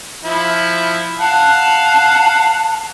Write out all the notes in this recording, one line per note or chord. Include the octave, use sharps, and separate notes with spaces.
F3 E4
F5 F#5 A5